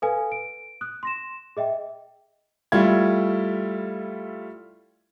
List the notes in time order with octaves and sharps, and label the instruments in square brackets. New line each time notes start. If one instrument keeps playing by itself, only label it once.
[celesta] A4 B4 F5 G#5
D7
D#6 F#6
C6 A#6 E7
G#4 D#5 E5 G5
[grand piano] G3 A3 E4 F4 G#6